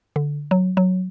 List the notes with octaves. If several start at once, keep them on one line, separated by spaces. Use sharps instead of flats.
D3
F#3
F#3